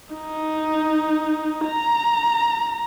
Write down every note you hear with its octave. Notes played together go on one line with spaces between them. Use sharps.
D#4
A#5